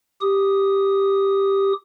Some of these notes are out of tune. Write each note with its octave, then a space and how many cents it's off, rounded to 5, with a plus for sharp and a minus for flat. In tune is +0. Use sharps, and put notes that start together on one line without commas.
G4 +0 D#6 +0